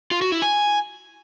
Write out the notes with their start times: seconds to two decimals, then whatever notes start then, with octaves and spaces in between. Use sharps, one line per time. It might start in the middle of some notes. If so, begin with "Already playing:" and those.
0.11 F4
0.22 F#4
0.32 E4
0.42 G#5